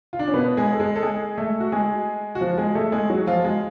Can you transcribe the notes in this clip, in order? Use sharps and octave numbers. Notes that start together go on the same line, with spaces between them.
F4
D4
C#4
B2 B3
G#3 G#4
A4
G#3 G#4
A4
G#3 G#4
A3 A4
F#4
G#3 G#4
F#4
F3 F4
G#3 G#4
A3 A4
G#3 G#4
F#3 F#4
F3 F4
G#3